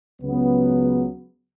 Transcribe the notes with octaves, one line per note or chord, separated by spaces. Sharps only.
C#2 C#3 F#3 B3